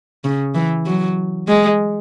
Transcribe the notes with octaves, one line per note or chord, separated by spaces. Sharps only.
C#3
E3
F#3
G#3